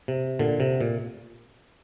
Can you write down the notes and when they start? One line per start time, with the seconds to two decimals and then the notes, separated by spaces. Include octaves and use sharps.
0.08 C3
0.39 A#2 D3
0.60 C3
0.81 A#2